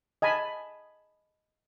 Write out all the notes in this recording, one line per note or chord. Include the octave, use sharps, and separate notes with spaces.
D#5 G#5 A5 B5